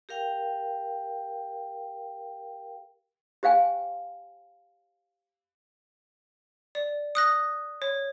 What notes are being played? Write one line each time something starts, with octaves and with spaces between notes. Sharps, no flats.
G4 A#4 F5 G5
G4 C5 F5 G5 G#5
D5
D#6 F#6 A#6
C#5